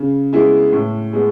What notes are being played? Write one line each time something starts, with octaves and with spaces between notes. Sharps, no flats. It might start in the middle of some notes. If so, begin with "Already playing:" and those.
Already playing: C#3
G#3 B3 E4
A2
G#3 B3